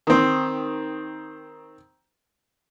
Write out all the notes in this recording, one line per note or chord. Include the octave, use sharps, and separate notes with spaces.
D#3 C4